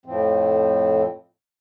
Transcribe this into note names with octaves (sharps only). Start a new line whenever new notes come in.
F2 A2 F3 C4